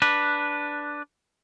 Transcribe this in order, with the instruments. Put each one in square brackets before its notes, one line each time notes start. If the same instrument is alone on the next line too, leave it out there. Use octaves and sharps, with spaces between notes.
[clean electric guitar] D4 B4